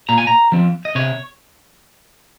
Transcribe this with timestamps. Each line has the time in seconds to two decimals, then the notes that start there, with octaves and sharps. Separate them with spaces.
0.09 A#2 A#5
0.18 G#5
0.27 A#5
0.52 F3 C4
0.85 D#5
0.95 C3 C#5